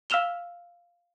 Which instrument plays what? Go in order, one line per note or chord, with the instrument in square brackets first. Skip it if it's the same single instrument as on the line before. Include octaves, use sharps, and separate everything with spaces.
[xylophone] F5 E6 F6 E7 F7 G7